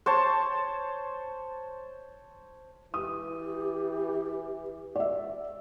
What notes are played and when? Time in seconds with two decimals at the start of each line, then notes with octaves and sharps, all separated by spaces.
0.06 C5 C#5 A5
2.94 E3 G4 D#6
4.96 D5 E5